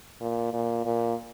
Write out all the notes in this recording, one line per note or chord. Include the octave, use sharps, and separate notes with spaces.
A#2
A#2
A#2